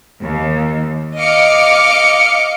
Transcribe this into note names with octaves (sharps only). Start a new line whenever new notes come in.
D#2
D#5 F5 D6 F6 C#7